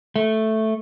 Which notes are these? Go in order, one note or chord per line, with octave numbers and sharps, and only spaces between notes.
A3